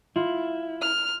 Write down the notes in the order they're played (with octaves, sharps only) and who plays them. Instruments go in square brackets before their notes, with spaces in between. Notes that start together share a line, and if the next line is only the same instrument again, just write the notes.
[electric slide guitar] E4 [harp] F4
[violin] F6